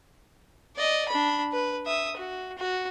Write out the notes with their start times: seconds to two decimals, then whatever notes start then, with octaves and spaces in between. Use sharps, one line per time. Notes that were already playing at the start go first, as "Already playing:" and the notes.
0.76 D5 D#5
1.08 D4 B5
1.52 B4
1.86 E5 D#6
2.17 F#4
2.58 F#4